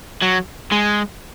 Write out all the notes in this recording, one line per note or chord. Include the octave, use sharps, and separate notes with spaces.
F#3
G#3